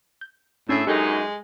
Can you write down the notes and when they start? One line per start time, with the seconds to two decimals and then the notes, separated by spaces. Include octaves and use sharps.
0.21 G6
0.69 A2 C#4 D4 G#4 A4 E5
0.87 F#2 G#3 D#4 G4 A4 G5